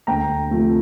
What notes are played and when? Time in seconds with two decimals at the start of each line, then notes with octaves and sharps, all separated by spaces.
0.07 D2 G5 A#5
0.51 C3 F3 A3